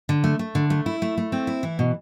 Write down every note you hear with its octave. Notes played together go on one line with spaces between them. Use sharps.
D3
A3
A3
D3
A3
E4
A3
A3
C4
E4
E3
B2